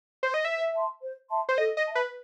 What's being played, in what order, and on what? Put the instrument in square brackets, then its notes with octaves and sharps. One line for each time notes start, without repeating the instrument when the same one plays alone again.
[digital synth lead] C5
D#5
[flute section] C5 [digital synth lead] E5
[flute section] E5 A5 C6
C5
E5 A5 C6
[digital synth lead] C5
[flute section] A4 [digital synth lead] D#5
[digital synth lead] D#5
[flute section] E5 A5
[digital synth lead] B4